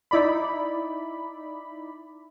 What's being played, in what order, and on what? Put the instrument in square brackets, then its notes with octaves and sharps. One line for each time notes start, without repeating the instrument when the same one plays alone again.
[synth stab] D#4 E4 D5 B5